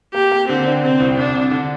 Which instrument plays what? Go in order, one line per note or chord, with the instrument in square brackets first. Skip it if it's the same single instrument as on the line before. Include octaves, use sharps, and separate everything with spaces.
[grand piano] A#3 [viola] G4
[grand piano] A#3
[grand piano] D3 [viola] C4
[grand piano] D4
[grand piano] C3 [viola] C4
[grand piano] C2
[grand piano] C2 [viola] D4
[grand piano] C3
D3